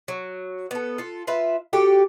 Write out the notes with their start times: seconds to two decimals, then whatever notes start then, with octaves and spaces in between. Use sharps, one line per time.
0.08 F#3
0.71 B3 A4
0.98 F4 A4
1.27 F4 B4 E5
1.73 F#4 G4 A4